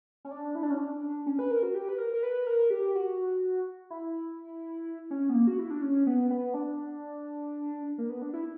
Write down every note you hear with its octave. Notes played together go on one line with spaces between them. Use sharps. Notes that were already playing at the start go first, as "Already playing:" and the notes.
C#4
D4
E4
D4
C#4
D4
C#4
B4
A#4
F#4
G4
B4
A#4
A#4
B4
A#4
G4
F#4
E4
C#4
B3
A#3
F#4
E4
D4
C#4
B3
B3
D4
A#3
B3
D4
E4